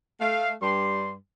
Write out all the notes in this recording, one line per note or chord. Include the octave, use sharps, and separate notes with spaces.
A3 F5
G2 G3 C6